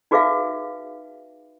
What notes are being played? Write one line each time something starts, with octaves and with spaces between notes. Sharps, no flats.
D#4 F#4 G#4 B4 E5 F5